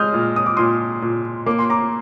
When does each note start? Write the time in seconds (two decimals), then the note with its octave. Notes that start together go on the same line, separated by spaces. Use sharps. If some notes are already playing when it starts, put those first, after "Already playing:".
Already playing: G#3 D#6 F6 G6
0.14 A#2
0.36 D#6
0.46 D6
0.57 A#2 C6 D#6
1.02 A#2
1.46 A#3 D6
1.59 C6
1.70 A#5 D6